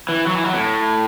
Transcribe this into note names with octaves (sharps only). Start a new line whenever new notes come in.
E3
F#3
E3
F#3
A2